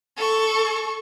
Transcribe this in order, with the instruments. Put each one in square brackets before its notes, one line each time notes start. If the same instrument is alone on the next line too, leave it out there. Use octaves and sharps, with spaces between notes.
[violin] A4 C#6